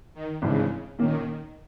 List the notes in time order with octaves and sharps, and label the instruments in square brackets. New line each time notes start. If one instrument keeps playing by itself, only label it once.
[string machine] D#3
[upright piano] G#1 G2 E3 G#3 [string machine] C#3
[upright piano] A#2 A#3 C#4 [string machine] D#3